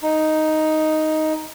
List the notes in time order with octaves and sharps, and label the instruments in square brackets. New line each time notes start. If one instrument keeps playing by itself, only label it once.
[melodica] D#4